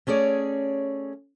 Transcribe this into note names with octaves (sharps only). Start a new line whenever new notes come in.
A3 C#4 G#4 C#5 D5